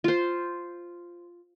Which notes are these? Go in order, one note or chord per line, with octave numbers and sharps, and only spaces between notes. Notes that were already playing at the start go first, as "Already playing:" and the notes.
F4 C5